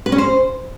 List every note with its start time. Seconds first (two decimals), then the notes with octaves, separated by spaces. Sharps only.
0.06 B4
0.12 C#4
0.18 C5